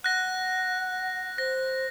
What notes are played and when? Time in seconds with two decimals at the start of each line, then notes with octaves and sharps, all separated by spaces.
0.04 F#5 F#6 A#6
1.38 C5 A#6